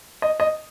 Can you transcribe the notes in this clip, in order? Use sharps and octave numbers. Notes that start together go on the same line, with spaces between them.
D#5
D#5